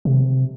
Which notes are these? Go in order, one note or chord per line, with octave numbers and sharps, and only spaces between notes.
C3